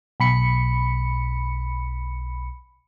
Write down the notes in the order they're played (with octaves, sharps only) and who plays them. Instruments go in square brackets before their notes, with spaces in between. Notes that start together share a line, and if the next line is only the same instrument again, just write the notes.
[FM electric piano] B1 B5 C#7